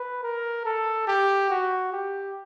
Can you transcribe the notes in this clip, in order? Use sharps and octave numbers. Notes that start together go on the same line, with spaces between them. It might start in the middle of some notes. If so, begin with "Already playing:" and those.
Already playing: B4
A#4
A4
G4
F#4
G4